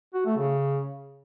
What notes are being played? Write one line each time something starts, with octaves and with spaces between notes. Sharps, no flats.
F#4
A3
C#3